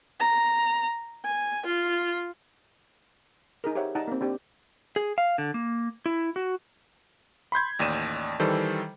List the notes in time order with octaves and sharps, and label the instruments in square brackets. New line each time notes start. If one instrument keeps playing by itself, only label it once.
[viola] A#5
G#5
F4
[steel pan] D#4 G#4 A#4
G4 C5 C#5 E5 F#5
D#4 D5 F#5 A5 A#5
A#3 C4
C4 D4 G4
[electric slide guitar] G#4
F5
D3
A#3
E4
F#4
[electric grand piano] B5 C6 G6 G#6
A1 D#2 D5 D#7 E7
D#3 E3 G3 A4 C5